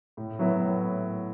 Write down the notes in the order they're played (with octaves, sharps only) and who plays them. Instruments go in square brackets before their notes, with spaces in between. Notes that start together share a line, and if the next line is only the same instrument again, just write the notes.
[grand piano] A2
F#3 B3 E4
A2